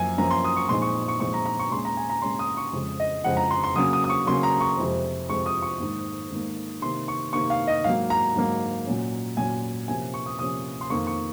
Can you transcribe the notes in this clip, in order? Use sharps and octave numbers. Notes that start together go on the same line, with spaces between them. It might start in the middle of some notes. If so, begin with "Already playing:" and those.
Already playing: F#2 F3 A#3 C#4 G#5
F#2 F3 A#3 C#4 A#5
C6
D#6
C#6
A#2 F3 G#3 C4 D#4 C6
C#6
C#6
A#2 F3 G#3 C4 D#4 C#6
A#5
A#5
C#6
A#2 G#3 C#4 C6
A#5
G#5
A#5
A#2 G#3 C#4 C6
D#6
C#6
F2 C#3 F3 G#3
D#5
F2 C#3 F3 G#3 F#5
A#5
C6
C6
C#3 F#3 A#3 C#4 D#6
D#6
D#6
C#6
C#3 F#3 A#3 C#4 C6
A#5
C#6
F2 C3 F3 G#3 C4
F2 C3 F3 G#3 C4 C#6
D#6
C#6
G#2 D#3 A#3
G#2 D#3 A#3
C3 D#3 A#3 C6
C#6
C3 D#3 A#3 C#6
F5
D#5
G#2 F#3 A#3 F5
A#5
G#2 F#3 A#3
A#2 F#3 C#4
A#2 F#3 C#4 G#5
C3 F3 A#3 C#4 G#5
C#6
D#6
C3 F3 A#3 C#4 D#6
C6
F2 D#3 A#3 C#6
C#6